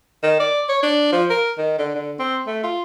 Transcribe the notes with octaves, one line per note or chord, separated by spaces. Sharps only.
D#3
D5
C#5
D4
F3
A#4
D#3
D3
D3
C4
A3
F4